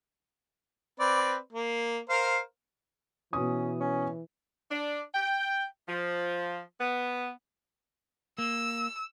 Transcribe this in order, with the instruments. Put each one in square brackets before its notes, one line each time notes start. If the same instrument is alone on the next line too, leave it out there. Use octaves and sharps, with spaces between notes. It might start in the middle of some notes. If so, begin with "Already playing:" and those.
[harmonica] C4 B4 D5
A#3
A#4 C5 F5
[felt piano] B2 D#6 [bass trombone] E3 [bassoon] C#4
[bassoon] C#4
[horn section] D4
G5
F3
B3
[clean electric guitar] A#3 [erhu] E6